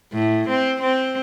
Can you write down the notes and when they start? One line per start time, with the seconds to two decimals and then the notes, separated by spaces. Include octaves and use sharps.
0.12 A2
0.49 C4
0.82 C4